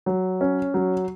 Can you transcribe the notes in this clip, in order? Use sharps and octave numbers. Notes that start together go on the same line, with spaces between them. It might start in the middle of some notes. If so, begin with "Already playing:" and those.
F#3
C#4
F#3